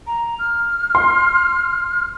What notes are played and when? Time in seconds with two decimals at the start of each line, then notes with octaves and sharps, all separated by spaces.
0.07 A#5
0.39 F6
0.95 C6